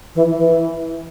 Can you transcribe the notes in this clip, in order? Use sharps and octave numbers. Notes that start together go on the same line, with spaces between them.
E3
E3